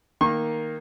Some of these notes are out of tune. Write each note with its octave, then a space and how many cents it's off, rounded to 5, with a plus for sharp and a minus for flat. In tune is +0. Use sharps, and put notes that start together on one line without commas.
D#3 +0 A#3 +0 C#6 -35